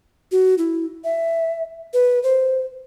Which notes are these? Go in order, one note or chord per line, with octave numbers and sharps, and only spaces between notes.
F#4
E4
E5
B4
C5